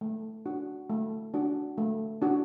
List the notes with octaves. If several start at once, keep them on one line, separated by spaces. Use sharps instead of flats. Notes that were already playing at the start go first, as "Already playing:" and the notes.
A3
D4 F#4
A3
D4 F#4
A3
D4 F#4